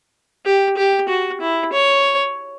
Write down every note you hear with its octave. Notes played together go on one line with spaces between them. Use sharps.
G4
G4
F#4
E4
C#5